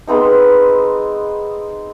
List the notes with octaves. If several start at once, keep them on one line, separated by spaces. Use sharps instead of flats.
G#3 B3 C4 D#4